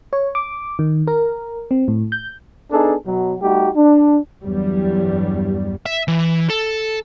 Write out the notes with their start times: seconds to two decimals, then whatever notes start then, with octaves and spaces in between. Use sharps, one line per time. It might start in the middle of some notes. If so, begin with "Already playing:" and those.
0.13 C#5
0.35 D6
0.79 D#3
1.07 A#4
1.71 C4
1.88 A2
2.12 G6
2.72 B3 D4 D#4 G#4 A4
3.06 B2 F#3
3.42 G3 A3 D#4 F#4 G4
3.75 D4
4.44 E2 G2 F#3 G3
5.86 E5
6.08 E3
6.50 A4